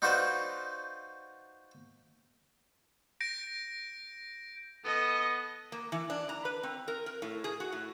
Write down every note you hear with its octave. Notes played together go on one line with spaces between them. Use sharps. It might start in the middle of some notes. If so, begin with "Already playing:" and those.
D#4 F4 F#4 B4 C5 D5
G6 A#6 D7
B3 A4 D#5
A#3
E3
D4
A#5
B4
C4
A#4
A#4
A2
G#4
F#4
A2